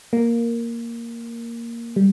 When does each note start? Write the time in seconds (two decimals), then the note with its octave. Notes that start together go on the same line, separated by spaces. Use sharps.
0.13 A#3
1.96 G3